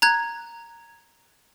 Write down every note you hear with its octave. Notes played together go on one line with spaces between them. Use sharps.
A#5 F#6 G#6